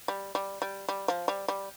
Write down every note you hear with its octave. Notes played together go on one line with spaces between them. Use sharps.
G3
G3
G3
G3
F3
G3
G3